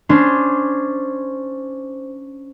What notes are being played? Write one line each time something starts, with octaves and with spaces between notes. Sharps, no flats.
C#4 D4 C5 C6